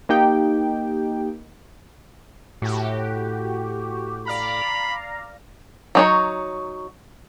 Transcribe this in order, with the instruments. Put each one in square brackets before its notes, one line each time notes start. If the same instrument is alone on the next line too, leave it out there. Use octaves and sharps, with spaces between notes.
[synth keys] A#3 D#4 G4 G5
[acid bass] A2 [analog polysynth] F#4 G4
[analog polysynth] D5 F5 A#5 [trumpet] B5
[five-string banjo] F#3 D#4 C#5